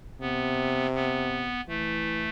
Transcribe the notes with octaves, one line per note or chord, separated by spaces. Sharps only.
C3 B3
B3
E3 A3